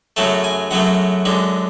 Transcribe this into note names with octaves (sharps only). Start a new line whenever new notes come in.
F#2 C#3 F#3 A3 A5
G#5
F#2 C#3 F#3 A3 F#5
F#2 D3 G#3